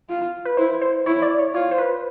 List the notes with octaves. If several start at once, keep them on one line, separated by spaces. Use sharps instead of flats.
F4
B4
E4 C5
C5
E4 C#5
D5
C#5
F4 C#5
C5
B4